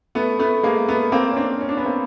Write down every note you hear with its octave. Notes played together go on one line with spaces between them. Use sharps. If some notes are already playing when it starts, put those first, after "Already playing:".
A3 B3
A3 B3
G#3 A#3
A3 B3
A#3 C4
C#4
C4 D4
C#4
D4
B3 C#4
A#3 C4